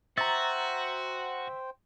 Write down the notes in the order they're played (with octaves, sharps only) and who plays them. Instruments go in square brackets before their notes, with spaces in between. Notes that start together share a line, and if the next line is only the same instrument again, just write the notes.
[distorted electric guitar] F#4 [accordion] C5 G5 [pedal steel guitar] E5 [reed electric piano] A#5 A6